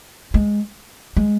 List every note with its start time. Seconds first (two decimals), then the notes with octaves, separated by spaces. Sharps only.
0.34 G#3
1.17 G#3